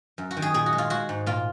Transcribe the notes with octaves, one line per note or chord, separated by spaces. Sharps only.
F#2
F#4
D#3
G#4
A#2 G#4
F#4
G#3
F4
G#3 F#4
G#2
A#2 F4